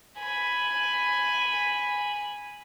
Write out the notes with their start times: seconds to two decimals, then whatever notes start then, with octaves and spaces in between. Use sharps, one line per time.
0.18 G#5 B5